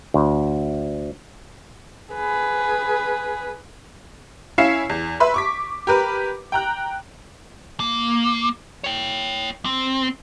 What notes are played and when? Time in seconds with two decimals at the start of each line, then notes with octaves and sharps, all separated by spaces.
0.14 D2
2.13 G#4 B4
4.58 C#4 E4 F5 C7 C#7 E7
4.89 E2
5.20 B4 E5 B5 C6
5.34 C#6 D6 B6
5.87 G4 A#4 B4
6.52 G5 A#5 F#6
7.80 A#3
8.84 C#5 G5
9.65 C4